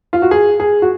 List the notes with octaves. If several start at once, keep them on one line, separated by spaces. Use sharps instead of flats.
F4
F#4
G#4
G#4
F#4